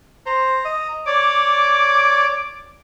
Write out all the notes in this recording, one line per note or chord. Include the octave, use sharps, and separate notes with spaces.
C5 A#5
D#5
C#5 D5 D6